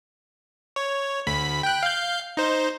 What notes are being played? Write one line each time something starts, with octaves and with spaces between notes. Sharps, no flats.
C#5
D2 B5 B6
G5 F#6
F5 G6
D#4 C5